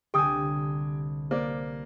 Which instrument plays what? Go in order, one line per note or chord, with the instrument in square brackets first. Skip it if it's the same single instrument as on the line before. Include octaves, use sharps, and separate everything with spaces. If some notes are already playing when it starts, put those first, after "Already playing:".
[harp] C2 D3 [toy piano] G4 D#6 E6 [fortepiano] G5 G#5
[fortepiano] A#3 D5 [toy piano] C5